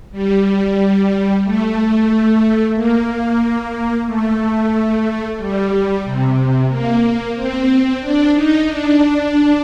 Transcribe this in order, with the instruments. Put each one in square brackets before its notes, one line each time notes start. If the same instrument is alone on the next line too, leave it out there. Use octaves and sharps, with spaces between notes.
[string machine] G3
A3
A#3
A3
G3
C3
A#3
C4
D4
D#4
D4